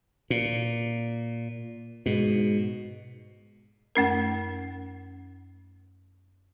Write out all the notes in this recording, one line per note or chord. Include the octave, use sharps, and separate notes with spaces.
A#2
G#2 B2
F#2 A3 C#4 A#4